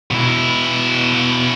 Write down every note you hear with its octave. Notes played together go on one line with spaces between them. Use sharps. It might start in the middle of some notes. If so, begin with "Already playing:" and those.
B2 E4